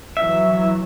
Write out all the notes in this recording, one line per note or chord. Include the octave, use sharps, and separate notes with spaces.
E3 F#3 E5